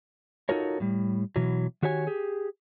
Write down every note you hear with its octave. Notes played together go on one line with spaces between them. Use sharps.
D#4 F4 F#4 A4 A#4 C#5
A2 G3
B2 E3 F#3
D#3 F#4 G4 C#5 G#5
G4 G#4